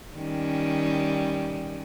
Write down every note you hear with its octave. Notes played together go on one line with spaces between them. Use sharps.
D#3 G3 C#4